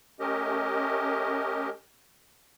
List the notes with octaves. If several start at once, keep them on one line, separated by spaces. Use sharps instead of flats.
A3 C#4 G4 A#4 D#5